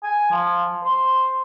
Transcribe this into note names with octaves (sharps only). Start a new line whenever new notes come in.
G#5
F3
C5